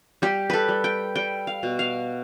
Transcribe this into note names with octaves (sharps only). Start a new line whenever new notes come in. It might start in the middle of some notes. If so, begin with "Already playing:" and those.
G3 G4
A4 B4
G3
G5
G3 G5
F5
B2
F5